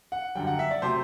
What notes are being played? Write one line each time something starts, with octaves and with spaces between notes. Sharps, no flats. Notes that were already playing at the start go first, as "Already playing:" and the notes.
F#5
F#2 D3 G3 G5
F#5
E5
D5
C3 F#3 A3 C5